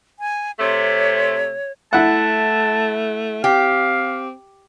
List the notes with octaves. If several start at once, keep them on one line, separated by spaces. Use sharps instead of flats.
G#5
C3 A3 C#5
A3 E4 F#5 A5
C4 G4 F5